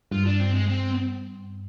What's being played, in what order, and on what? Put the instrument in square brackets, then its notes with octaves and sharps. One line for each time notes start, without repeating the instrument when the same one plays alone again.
[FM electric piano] G2 [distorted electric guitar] F4
[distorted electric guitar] D4
C4
G#3
C4